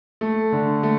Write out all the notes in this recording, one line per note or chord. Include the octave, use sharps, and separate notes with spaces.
A3
D3
A3